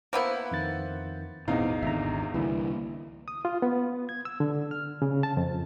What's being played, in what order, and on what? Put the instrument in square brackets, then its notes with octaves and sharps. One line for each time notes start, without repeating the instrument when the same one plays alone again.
[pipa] A#3 B3 E4 [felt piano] C5 F#5
[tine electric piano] F2 D#3 A6
[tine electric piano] A1 E3 [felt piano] E2 D#4 F5 [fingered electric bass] B2 C4
[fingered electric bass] G#1 D3 [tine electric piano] E5 A#5
[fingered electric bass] C2 D3 A#3 [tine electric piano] E3 E4
[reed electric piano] D#6
F4
B3
G#6
E6
D3
F6
C#3
A5
F2